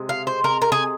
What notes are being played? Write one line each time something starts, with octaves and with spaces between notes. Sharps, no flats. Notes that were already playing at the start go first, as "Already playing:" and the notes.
Already playing: C3 G#3
F5
C5
A#4
A#4
G#4